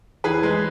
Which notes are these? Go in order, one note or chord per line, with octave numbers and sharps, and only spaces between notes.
E3 G#4 B4
G#3